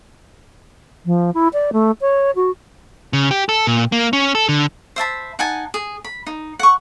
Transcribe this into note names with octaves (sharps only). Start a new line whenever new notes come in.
F3
E4
D5
A3
C#5
F#4
C#3
G4
A4
A#2
A#3
C#4
A4
D3
C5 E5 A5 B5
D#4 F#5 G#5 A5
G#4
B5
D#4
F#5 C#6